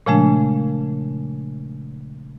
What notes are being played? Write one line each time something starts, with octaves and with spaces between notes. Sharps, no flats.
A#2 C#3 F3 G#3 A3 D4